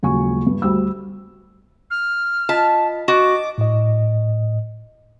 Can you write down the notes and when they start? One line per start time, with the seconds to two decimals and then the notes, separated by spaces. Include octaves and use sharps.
0.03 D#1 C#3 F#3 G#3 G#5 C#6
0.47 G2
0.62 D2 G3 C5 E6
1.90 F6
2.49 F4 D#5 A5 B6
3.08 F#4 D#5 D6
3.58 A2 D#5